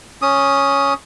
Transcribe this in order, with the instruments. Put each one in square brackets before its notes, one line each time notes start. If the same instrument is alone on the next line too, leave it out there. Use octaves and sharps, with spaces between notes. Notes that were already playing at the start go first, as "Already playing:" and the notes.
[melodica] C#4 D#6